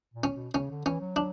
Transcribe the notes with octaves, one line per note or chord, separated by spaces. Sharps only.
A#2
C#4
B2
C#3 C#4
D3
E3 C#4
F#3
F#3 D4